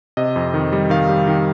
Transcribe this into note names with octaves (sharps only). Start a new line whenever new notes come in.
C3 D#5
F2
D#3
G3
D#3 F5
G3
D#3